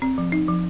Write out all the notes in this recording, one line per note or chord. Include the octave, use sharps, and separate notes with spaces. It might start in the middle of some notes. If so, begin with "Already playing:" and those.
C4
F3
D#4
F3